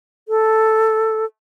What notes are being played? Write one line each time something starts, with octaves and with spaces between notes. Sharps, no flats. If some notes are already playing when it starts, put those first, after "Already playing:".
A4